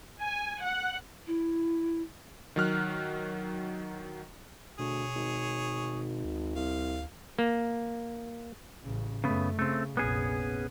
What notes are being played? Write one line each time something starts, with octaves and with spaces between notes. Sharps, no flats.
G#5
F#5
E4
D#3 F#3 F6 F#6
D2 B2 G#4 C#5
G#1
D2
C2 F5
A#3
A1 C#3
F#2 C#3 A3 B3
C#3 A3 C4
F1 A#1 B3 C#4 G#4